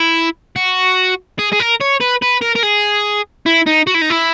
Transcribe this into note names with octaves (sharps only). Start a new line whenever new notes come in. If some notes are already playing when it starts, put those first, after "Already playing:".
Already playing: E4
F#4
G#4
G#4
A#4
C#5
B4
B4
A#4
A#4
G#4
E4
D#4
F#4
E4
D#4
E4